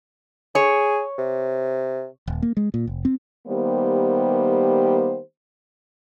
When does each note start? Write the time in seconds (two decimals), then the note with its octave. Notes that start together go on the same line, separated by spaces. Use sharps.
0.55 G#4 C#5
1.18 C3
2.27 D#1
2.42 A#3
2.57 G#3
2.74 A#2
2.87 F1
3.05 C4
3.47 D#3 G3 A#3 B3 G4 C5